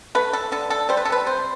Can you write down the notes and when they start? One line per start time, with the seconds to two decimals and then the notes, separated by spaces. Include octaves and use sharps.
0.15 A3 B4
0.33 A4
0.52 D3 A4
0.70 A4
0.89 G3 C5
0.97 B4
1.05 A4
1.12 B4
1.26 C3 C5